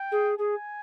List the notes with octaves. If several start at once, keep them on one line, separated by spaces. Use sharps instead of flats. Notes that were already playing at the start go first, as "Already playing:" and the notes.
Already playing: G5
G#4
G#4 G#5